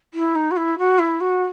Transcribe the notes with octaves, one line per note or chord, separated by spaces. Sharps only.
E4
D#4
F#4
E4
F#4
E4
F#4